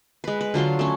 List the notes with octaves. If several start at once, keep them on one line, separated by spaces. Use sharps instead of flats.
G#3 B4
B4
D3 F#3 F4 C6
A3 C#4